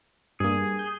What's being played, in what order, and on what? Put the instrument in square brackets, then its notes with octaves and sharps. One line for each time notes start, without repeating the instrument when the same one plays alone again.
[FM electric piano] G2 A#3 [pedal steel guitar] G#4
[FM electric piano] G6